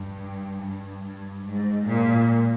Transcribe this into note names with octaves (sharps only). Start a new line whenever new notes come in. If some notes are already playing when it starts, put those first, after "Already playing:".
Already playing: G2
G2
G2
G#2
A#2